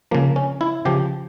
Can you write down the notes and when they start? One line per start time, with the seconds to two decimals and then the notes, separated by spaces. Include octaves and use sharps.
0.11 C#3 F3 A#3
0.36 C#4
0.61 E4
0.85 C#3 F3 G4